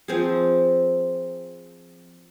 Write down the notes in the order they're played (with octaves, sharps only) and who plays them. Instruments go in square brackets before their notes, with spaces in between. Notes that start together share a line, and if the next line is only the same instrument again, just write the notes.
[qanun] F3 C4 G#4